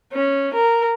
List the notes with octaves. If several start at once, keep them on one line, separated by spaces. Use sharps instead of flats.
C#4
A#4